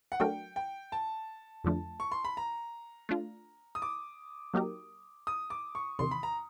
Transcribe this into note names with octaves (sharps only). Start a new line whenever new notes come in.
F#5
F#3 A3 D4 F#4 A#4 G5
G5
A5
F2 D3 F3 A3 D4
C#6
C6
B5
A#5
A3 D4 F4
D#6
D6
F#3 A#3 D#4 G4 A#4
D#6
D6
C#6
E2 C3 D#3 C6
B5
A#5